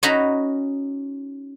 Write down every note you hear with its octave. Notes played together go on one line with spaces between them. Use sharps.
C#4 D#4 F#4 A#5 B5